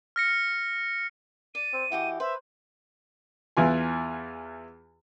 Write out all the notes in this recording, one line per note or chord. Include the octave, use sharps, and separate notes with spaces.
F6 A#6 C#7
D5 D#7
C4
E3 F#4 G4 D#5
B4 C5 E5
E2 E3 F4 G#5